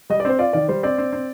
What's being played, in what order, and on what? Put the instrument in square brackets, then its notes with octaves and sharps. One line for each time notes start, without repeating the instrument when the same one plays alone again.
[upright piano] G3 [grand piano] D#5
[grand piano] D5
[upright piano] C4 [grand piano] C5
[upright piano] F4 [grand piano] D5
[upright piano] D#3 [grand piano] D5
[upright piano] G3 [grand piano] C5
[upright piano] C4 [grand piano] D5
[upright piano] C4
C4